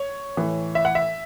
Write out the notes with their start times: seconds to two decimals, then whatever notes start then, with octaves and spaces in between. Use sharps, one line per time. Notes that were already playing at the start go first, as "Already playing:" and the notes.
Already playing: C#5
0.37 A2 E3
0.75 E5
0.85 F#5
0.95 E5